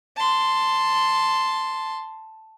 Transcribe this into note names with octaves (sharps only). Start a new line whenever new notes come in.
A5 C6